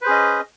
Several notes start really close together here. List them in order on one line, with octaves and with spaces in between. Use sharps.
B4 C5 G#4 C#4 D#5